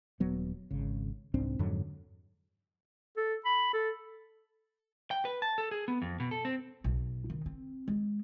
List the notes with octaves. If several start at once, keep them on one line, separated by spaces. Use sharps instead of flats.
D#1 F#3 B3
G#1 C#3
C2 G#2 C4 D4
F2 G#2 D3 F#3
A4
B5
A4
G5
B4
A5
A4
G#4
B3
F2
B2
A4
C4
B1
D#3
C4
G#3